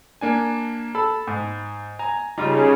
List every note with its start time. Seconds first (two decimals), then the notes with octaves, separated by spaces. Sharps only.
0.21 A#3 D4 G#5
0.95 A4 B5
1.27 G#2
1.99 G#5 A#5
2.38 C#3 G3 D#4 F4